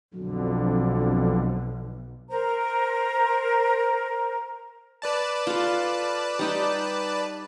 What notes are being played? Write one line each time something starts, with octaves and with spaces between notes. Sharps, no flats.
B1 F2 D3 F#3
A#4 C5 A#5
B4 D5 A5
F4 A4
G3 D#4 G4